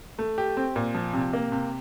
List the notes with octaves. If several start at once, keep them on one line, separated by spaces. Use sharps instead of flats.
A3
G4
C4
A#2
F3
C3
A#3
C3